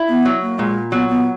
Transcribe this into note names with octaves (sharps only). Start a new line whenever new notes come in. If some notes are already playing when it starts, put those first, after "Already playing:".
Already playing: E4
B3
F#3
A#3
A#2 G#3
F#3 B3
B3